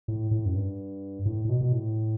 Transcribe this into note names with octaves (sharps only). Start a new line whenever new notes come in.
A2
A2
F#2
G2
A2
A2
B2
B2
A2